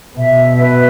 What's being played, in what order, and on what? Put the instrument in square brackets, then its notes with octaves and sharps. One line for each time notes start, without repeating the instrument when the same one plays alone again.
[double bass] B2 [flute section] E5
[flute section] B4